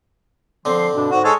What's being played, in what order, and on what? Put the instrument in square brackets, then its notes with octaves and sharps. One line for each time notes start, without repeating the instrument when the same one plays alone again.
[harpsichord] D3 C4 [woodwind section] F3 C6
[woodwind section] G2 B2 D4
[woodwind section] G#2 [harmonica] F#4
[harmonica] G#3 A4 C#5